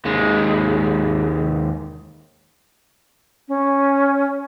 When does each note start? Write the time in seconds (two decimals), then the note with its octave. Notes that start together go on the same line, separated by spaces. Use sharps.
0.05 D#2 G#3
3.48 C#4